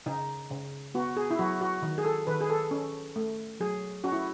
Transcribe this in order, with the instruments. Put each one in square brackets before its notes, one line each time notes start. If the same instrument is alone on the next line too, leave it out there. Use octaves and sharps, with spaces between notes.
[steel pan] C#3 D#4
C#3
B3 F#4
G#4
E4
F#3 F#4
F#4
D#3
G#4
A4
D#3 B4
G#4
A4
C#4
A3
F#3 G#4
C#4 F#4
E4